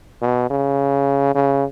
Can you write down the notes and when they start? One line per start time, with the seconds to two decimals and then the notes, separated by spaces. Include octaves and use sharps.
0.22 B2
0.50 C#3
1.35 C#3